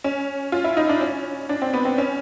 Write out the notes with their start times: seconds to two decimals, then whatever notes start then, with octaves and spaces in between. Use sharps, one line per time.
0.04 C#4
0.52 F4
0.64 E4
0.77 D#4
0.89 D4
1.01 C#4
1.49 D4
1.62 C4
1.74 B3
1.85 C4
1.98 C#4